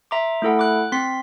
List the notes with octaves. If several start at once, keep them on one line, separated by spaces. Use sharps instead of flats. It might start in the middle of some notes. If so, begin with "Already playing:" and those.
E5 A#5 C6 D6
A3 E4 A4 F#5
D6 F#6
C4 C6 B6